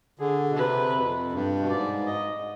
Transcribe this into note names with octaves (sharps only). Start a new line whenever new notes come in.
D3 G#4
B2
C3 B4
F2
G2
B2
G#2 D5
D#5